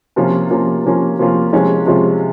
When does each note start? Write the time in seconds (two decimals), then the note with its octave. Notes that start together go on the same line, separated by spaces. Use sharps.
0.16 C3 F3 A#3 C#4 F4
0.51 C3 F3 A#3 C#4 F4
0.85 C3 F3 A#3 C#4 F4
1.19 C3 F3 A#3 C#4 F4
1.53 C3 F3 G#3 C#4 F4
1.87 C3 F3 G#3 C#4 F4